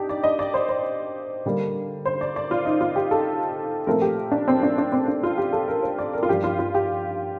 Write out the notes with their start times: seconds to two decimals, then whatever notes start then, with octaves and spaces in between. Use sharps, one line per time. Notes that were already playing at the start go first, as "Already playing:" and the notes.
Already playing: D4 D#4 G4
0.09 D5
0.24 D#5
0.39 D5
0.54 C5
0.69 C5
1.46 D3 G3 A#3
2.06 C5
2.21 D5
2.36 D5
2.51 F4
2.65 D#4
2.81 F4
2.96 G4
3.11 A4
3.87 A#2 F3 A3 C4 A#4
4.02 G4
4.32 D4
4.48 C4
4.63 D4
4.78 D4
4.92 C4
5.08 D4
5.23 F4
5.38 G4
5.52 A4
5.68 A#4
5.83 C5
5.98 D5
6.13 A#4
6.23 F4
6.29 G2 F3 A#3 G4
6.44 F4
6.59 F4
6.74 G4